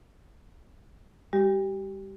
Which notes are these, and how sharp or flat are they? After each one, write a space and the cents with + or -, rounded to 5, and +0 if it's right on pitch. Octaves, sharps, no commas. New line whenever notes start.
G3 +35 G4 -25